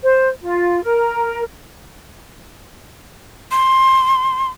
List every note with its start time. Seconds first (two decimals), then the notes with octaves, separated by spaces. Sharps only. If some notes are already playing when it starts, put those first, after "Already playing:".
0.03 C5
0.41 F4
0.83 A#4
3.51 C6